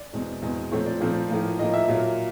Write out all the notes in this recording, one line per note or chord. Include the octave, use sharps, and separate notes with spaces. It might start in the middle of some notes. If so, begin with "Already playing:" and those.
Already playing: D5
E2 B2 G#3 C4
E2 B2 G#3 C4
A#2 F3 A3 C4 C#5
D5
A#2 F3 A3 C4
A2 F3 A#3
A2 F3 A#3 D#5
E5
A#2 F#3 A#3